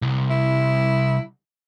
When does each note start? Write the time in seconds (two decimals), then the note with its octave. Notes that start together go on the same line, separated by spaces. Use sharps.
0.02 C2
0.30 E4